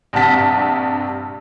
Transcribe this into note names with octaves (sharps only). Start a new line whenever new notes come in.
A#1 G2 C3 F#5 A5 B6